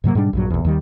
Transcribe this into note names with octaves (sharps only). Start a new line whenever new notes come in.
G2 C3 F#3 A#3
G#2 B2 G3 D4
A#1 G2 F#3
A#1 E2
D#2 D#3 G3